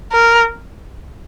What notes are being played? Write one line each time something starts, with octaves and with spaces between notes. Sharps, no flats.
A#4